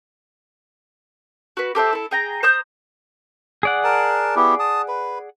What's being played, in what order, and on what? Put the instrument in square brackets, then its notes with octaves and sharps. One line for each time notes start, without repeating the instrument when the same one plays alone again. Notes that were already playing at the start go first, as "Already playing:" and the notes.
[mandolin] F#4 B4
G4 A4 C5 E5
E4 A4
G#4 G5 A#5
C5 A#5 D#6 G6
[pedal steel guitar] G#4 D5 F#5
[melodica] A#4 A5
B3 E4 G4
A5 D#6
B4